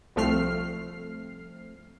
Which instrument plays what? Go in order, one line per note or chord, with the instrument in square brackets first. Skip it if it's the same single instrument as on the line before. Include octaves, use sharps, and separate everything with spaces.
[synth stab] C2 F3 A3 C4 F6 C7